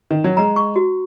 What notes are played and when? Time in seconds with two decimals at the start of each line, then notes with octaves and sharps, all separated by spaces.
0.11 D#3
0.24 F#3
0.37 G#3 A#5
0.56 C#6
0.76 F#4